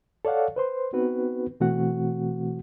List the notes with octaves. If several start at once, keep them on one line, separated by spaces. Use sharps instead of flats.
A4 C#5 D5 F5 F#5
B4 C5 C6
B3 C4 D#4 F#4 B4
B2 E3 A3 C4 F#4 F#5